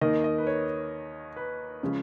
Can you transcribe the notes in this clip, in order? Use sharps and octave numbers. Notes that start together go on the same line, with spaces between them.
D#2 D#3 A#3 D#5
D#5
B4
C#5
B4
C#3 F3 G#3